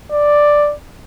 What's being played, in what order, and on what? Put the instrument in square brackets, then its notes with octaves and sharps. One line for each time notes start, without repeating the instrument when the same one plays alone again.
[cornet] D5